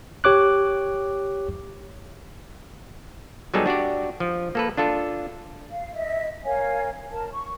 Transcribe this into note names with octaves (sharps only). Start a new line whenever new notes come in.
G4 C#5 D6 F#6
F#3 G3 B3 D#4 G#4 A4
D4 F#4 G4 D5
F3
A#3 A4 B4
D4 F4 A4
F5
D#5 E5
A#4 C#5 F5 G#5
A#4 A5
C#6